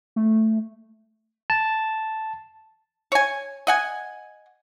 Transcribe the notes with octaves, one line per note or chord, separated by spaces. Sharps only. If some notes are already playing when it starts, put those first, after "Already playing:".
A3
A5
C#5 G#5
D#5 F#5 G#5